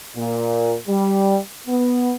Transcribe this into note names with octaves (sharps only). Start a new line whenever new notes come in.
A#2
G3
B3